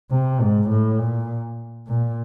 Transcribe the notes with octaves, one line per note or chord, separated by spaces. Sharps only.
C3
G#2
A2
A#2
A#2